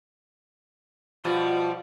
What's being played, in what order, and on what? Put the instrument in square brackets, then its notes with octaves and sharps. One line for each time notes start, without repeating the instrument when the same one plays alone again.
[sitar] B2 F3 G3 [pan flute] F4